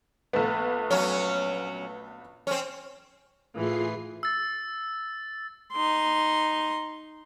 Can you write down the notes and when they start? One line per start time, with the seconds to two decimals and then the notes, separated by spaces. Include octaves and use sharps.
0.33 A#1 A3 B3
0.91 F#3 C#4
2.47 C4 C#4
3.54 A2 E3 F4 G#4 C7
4.23 E6 A6
5.73 D#4 C6